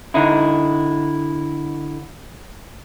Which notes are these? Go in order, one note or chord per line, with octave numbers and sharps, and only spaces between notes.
D3 D#4 E4